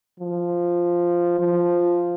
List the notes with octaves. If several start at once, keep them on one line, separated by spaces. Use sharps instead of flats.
F3
F3